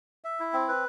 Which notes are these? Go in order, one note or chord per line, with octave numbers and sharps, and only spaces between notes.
E5
E4
C4
B4